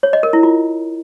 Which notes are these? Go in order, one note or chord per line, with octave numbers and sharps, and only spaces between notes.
C#5
D#5
A#4
E4
F4